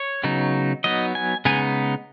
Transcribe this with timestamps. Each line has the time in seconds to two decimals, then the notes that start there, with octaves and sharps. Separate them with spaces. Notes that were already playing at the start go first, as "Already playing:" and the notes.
Already playing: C#5
0.24 C#3 F#3 B3 D#4
0.84 F#3 B3 D#4 D#5
1.15 G#5
1.45 C#3 G#3 B3 D#4 G#5